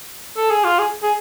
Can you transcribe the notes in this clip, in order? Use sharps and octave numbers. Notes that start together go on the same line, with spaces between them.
A4
G#4
F4
G#4
G#4